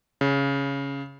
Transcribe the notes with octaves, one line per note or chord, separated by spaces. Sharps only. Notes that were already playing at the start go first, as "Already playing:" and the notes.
C#3